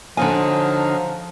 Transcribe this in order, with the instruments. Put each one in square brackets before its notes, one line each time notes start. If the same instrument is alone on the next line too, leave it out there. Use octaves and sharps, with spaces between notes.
[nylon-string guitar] D3 D#4 G#5 [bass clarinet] F3 [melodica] F#3 D#5 F5